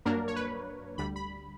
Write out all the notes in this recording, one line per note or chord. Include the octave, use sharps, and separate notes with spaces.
G2 F#3 A#3 D4 A#4
C#5
B4
D2 D3 G3 B5
B5